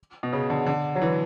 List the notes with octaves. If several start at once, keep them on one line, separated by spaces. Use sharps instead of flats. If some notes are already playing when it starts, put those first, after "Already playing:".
B2
C#3
D3
D3
F#3
E3